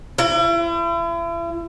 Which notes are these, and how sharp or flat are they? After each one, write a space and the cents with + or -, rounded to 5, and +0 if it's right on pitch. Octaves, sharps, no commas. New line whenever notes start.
E4 +40